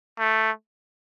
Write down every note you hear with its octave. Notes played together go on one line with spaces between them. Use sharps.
A3